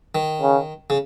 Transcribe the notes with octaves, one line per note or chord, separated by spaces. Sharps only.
D#3
C#3
C#3